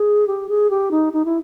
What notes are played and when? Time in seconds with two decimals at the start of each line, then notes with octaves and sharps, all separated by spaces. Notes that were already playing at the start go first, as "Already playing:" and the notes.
Already playing: G#4
0.27 G4
0.49 G#4
0.70 G4
0.91 D#4
1.13 D#4
1.25 E4